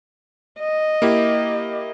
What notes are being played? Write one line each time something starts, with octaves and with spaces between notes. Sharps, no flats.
D#5
A#3 E4 G4